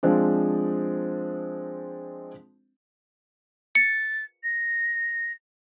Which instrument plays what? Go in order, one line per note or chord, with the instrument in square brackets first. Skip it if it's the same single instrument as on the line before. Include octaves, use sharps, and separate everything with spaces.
[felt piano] F3 G#3 C4 D4
[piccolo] A6 [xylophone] C#7
[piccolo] A#6